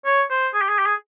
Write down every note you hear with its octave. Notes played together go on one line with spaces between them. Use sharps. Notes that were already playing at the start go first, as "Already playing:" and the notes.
C#5
C5
G#4
G4
G#4
G4
G#4